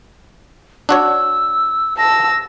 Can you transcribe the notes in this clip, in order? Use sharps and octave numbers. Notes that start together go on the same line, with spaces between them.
D4 F#4 C#5 E6
A5 E6 A#6